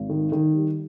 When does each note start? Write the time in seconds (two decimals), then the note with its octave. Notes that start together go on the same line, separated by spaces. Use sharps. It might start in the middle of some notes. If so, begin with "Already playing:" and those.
Already playing: G#1
0.09 D#3
0.32 D#3
0.54 G3